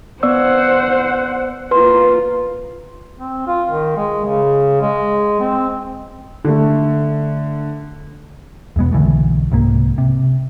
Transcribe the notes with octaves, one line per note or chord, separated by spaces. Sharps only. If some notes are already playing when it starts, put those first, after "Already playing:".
B3 C5 D5 F#5 E6
A#3 F4 B4 C6
C4
F4
D#3
G#3
C#3
G#3
C4
D3 A3
E2 B2 G#3 B3
B1 D3 E3 A3
C2 G#2 A#3
C3